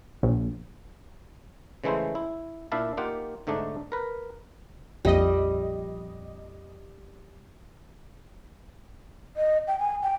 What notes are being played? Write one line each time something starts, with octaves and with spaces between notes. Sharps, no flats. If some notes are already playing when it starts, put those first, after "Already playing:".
A#1
C#3 E3 G#3 A3 E4 C5
E4
A#2 D4 E4 E5 F5 A5
A#3 D#4 F4 G4 F#5
G#2 D3 A3 D4 D#4
A#4 B4
A#1 F2 G3 D#5
D#5
G5
G#5
G5